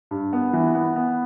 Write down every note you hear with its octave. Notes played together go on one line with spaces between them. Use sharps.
G2
B3
E3
B3
B3